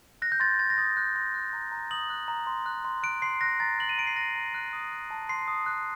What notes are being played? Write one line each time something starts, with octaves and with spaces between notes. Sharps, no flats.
F#6 A#6
G6
C6 A6
C6 A6
A#6
D#6 A6
F#6 G6
C6 A#6
F#6
A#5
A#5
D#6 F#7
F#6
A#5
C6
F#6
C6
F#6 D7
C6 C7
F#6 A#6
A#5 A6
F#6 F#7
D#7
A#5 D7
C7
F#6 A#6
A#5
F#6
D#6
F#6
A5
C6 C7
D#6
F#6